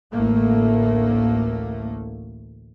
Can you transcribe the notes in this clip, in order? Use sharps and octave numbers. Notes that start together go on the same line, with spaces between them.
A1 D2 A2 A3 A#3